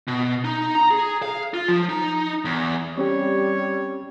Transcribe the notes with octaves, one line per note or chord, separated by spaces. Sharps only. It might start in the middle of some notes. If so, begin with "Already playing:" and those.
B2
D#4
A#5
G#4
F5
F4
F3
D#4
E2
G3 C4 C#4 G4 C#5